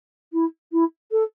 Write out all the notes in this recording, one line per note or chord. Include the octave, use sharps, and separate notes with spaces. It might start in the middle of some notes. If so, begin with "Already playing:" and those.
E4
E4
A4